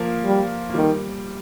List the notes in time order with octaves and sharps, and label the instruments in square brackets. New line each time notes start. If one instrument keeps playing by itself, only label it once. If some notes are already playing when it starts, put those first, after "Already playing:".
Already playing: [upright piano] F3 A#3
[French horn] G3
[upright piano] A#3
[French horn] D#3 [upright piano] G3